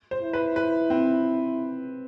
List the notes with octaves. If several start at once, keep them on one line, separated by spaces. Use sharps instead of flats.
C5
E4
B4
B4
C4